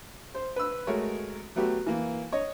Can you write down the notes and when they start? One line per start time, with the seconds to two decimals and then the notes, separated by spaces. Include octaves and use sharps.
0.35 C5
0.56 B4 E6
0.87 G#3 A3 F#4 A#4 C#5
1.56 F#3 A3 B3 F#4 G4
1.86 E3 A#3
2.32 C#5 D#5